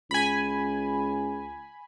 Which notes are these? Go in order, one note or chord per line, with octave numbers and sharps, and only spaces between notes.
C#2 G#5 B5